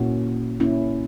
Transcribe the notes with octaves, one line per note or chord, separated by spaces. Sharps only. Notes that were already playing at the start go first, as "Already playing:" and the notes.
Already playing: A#2 A#3 C#4 E4 F#4
A#2 A#3 C#4 E4